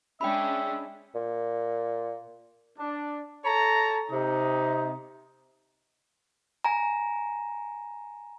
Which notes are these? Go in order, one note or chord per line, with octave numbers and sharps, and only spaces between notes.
G#3 C#4 D4 E5 G5 B5
A#2
D4
A4 C#5 A5 A#5
C3 D#4
G#5 A#5